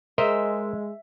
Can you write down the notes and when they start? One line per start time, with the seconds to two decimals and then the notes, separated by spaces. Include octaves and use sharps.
0.18 G#3 A#4 C5 D#5 E5